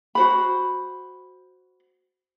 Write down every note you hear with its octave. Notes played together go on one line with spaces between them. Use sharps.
F#4 C5 B5